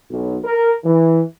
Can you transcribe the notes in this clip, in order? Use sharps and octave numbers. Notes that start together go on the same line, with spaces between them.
B1
A#4
E3